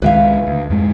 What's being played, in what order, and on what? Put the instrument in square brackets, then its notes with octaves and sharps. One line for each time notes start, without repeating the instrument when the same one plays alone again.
[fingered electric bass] C#2 D#3 G#3 [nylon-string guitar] B4 E5 F5
[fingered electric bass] D2
F2 G#2 G#3